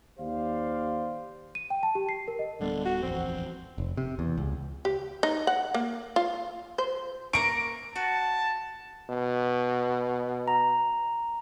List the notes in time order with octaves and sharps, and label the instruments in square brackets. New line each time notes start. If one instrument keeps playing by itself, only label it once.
[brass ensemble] D#2 G4 C5 D5 F5
[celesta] D#7
G5
A5
G4
C7
A#4
D#5
[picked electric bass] D1 G3 B3 [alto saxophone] D3
[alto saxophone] F#4
[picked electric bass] D#1 A1 F2 [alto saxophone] C4
[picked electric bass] F1
C3
E2
C#2
[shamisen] G4
D#4
F#5
A#3
F4
C5
[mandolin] A#3 A#5 C#6 [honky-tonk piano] D7
[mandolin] F#4 [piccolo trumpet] A5
[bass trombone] B2
[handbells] A#5